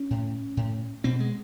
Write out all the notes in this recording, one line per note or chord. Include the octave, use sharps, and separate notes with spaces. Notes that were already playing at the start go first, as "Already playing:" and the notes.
Already playing: C#4
A2
A2
B2 C4
G#3